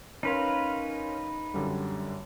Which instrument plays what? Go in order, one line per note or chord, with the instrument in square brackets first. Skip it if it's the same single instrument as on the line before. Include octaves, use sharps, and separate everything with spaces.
[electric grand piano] C#4 A#4 C6 [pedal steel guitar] D#4 B4 F5
[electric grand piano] F#2 D3 G3